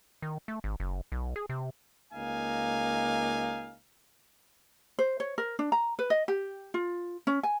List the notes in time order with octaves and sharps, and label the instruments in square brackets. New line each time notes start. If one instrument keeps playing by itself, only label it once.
[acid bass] D#3
A3
G#1
F#1
B1
G#4
C3
[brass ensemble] C#2 A#3 D#4 F5 G#5
[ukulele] C5
C#5
A#4
D4
A#5
B4
D#5
G4
F4
C#4
G#5